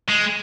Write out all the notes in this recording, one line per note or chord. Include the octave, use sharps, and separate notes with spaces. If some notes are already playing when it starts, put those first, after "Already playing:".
G#3